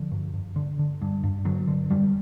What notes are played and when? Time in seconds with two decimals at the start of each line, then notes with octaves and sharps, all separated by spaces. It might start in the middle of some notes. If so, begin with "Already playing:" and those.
Already playing: D3 F3
0.12 G2
0.34 G2
0.56 D3
0.79 D3
1.02 G2
1.24 G2
1.45 D3 F#3
1.67 D3
1.90 F2 G3